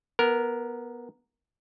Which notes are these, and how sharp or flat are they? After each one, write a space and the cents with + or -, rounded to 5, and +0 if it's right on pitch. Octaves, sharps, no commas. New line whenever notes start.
B3 -15 A#4 +0